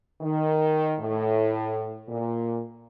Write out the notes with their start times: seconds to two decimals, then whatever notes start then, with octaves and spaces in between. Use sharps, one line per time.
0.21 D#3
1.00 A2
2.08 A#2